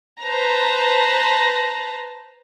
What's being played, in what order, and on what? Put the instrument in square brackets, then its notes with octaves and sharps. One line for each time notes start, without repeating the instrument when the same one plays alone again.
[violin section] B4 C5 A5 A#5